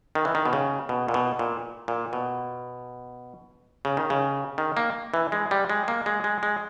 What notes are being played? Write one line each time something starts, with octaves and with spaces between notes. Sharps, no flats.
D#3
E3
D#3
B2
C#3
B2
A#2
B2
A#2
A#2
B2
C#3
D#3
C#3
D#3
A#3
E3
G#3
G3
G#3
A#3
G#3
G#3
G#3